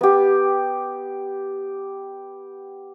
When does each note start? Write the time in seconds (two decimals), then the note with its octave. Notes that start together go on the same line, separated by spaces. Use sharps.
0.01 B3 G4